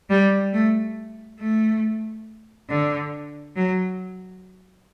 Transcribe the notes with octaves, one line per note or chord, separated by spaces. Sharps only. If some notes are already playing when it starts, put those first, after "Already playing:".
G3
A3
A3
D3
F#3